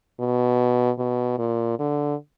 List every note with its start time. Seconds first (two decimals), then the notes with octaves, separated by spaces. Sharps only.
0.20 B2
0.99 B2
1.38 A#2
1.79 D3